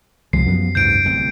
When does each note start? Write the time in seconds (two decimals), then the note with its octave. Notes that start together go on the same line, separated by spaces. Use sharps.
0.33 C2 F3 G#3 C7
0.46 F#2 F3 G3 B3
0.75 C#2 G#2 C3 G6 D7
1.04 D1 C2 C4